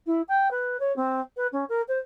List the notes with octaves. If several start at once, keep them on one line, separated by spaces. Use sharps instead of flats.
E4
G5
B4
C#5
C4
B4
C#4
A#4
C5